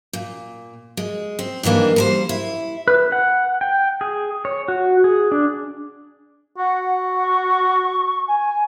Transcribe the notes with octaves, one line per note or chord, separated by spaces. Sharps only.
A#2
G#3
C4
G2 D#3 E3 A#3 D4
G3 A#4 C5
E4
B4
F#5
G5
G#4
C#5
F#4
G#4
D4
F#4 F#5
C#6
G#5